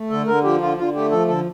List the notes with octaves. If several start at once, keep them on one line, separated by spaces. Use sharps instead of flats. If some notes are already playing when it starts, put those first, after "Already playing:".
Already playing: A3
D3 A4
D3 A#4
F3 G4
D3 F4
D3 F4
A3 G4
F3 A4
D3 A4